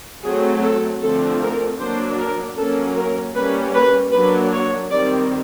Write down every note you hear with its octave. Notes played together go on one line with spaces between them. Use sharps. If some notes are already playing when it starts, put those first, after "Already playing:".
F#3 A3 C4 G#4
A4
D3 F3 A3 C4 A4
A#4
F#3 A#3 D4 C5
A#4
F#3 A#3 C#4 A4
A#4
G3 A#3 C#4 B4
B4
F#3 A#3 D4 B4
C#5
D#3 G3 C4 D5